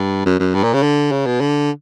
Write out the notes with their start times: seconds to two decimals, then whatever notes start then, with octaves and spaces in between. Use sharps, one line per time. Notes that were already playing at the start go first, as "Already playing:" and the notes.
Already playing: G2
0.26 F#2
0.40 F#2
0.54 G2
0.64 A#2
0.73 C#3
0.83 D3
1.12 C#3
1.26 B2
1.41 D3